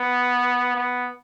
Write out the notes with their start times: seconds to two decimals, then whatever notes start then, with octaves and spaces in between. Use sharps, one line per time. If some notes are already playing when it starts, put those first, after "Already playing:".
Already playing: B3
0.76 B3